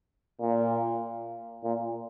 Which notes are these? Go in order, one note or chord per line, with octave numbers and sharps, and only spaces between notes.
A#2
A#2